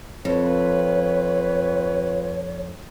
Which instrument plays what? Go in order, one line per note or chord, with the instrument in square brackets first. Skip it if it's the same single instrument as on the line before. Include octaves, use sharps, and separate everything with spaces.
[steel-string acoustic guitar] F2 [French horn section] C4 F4 B4 [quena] C#5